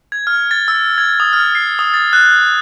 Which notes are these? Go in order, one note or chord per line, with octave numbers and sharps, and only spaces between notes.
G#6
F6
A6
E6
G#6
D#6
F6
C7
D#6
A6
F#6